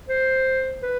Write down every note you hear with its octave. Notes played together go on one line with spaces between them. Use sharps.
C5
B4